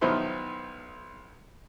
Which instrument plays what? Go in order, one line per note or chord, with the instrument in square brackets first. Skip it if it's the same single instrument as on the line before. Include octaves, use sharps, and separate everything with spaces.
[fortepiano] B1 B2 D#3 F3 E4 C6